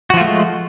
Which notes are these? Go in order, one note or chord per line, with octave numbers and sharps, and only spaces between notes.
F3 G#3 A3 F4 F#4